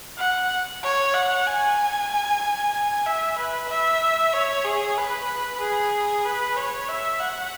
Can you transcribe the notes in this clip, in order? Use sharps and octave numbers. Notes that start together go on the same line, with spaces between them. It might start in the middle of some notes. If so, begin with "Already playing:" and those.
F#5
C#5
F#5
G#5
E5
B4
E5
C#5
G#4
B4
G#4
B4
C#5
E5
F#5